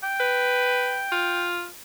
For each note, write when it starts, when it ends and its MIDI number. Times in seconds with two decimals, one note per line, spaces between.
0.03 1.48 79
0.20 1.04 71
1.12 1.67 65